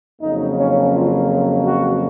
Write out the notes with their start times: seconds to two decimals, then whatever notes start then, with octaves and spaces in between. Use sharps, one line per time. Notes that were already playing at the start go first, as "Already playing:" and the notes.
0.21 F2 C#3 F#3 A#3 D#4
0.57 C#4
0.94 F4
1.65 F#4